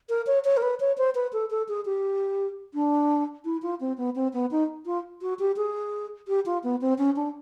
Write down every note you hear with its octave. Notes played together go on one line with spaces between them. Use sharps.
A#4
C#5
C#5
A#4
B4
C#5
C5
B4
A4
A4
G#4
G4
D4
E4
F4
C4
B3
C4
B3
D#4
F4
F#4
G4
G#4
G4
F4
B3
C4
C#4
D4